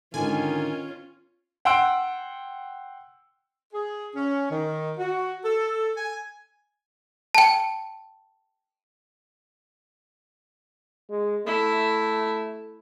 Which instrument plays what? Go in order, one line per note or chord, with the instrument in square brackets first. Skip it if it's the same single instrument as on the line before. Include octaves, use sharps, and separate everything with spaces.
[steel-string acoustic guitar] G#2 D3 [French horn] D#3 [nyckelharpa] C#4 F4 [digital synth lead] G#5
[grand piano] F#5 G5 C6 E6 D7
[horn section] G#4
C#4
D#3
F#4
A4
G#5
[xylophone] G5 A5
[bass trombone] G#3
[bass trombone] A3 [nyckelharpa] E4